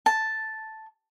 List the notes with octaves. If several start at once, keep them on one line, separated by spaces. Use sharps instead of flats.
A5